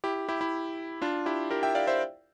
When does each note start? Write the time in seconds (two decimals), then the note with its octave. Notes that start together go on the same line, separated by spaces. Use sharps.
0.04 E4 G4
0.28 E4 G4
0.41 E4
1.02 D4 F4
1.26 E4 G4
1.51 G4 A#4
1.63 E5 G5
1.75 D5 F5
1.87 C5 E5